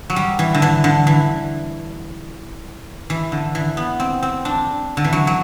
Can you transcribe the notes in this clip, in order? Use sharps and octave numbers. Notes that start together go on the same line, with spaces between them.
F#3
G3
E3
D3
E3
D3
E3
E3
D3
E3
B3
C4
C4
D4
D3
E3
F#3
F#3